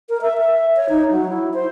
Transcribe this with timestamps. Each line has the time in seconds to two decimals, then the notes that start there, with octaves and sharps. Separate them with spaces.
0.09 A#4
0.22 E5
0.38 E5
0.76 C#5
0.89 D#4
1.11 F#3
1.29 E4
1.54 C5